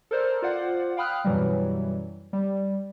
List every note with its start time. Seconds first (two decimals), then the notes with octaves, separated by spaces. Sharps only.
0.11 A4 A#4 C5 D5 F6
0.42 F4 C5 D5 F5 F#5
0.97 F5 G5 B5 D#6 F6 F#6
1.24 F#2 B2 E3 F#3 G3
2.33 G3